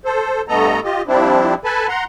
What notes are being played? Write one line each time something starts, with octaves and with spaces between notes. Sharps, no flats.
A4 C5
G2 A3 B3 A4 D#5 A#5
F4 G4 D#5
F3 G3 C4 D4 E4
A4 B4 G#5 A5 B5
F#5 A#5 C6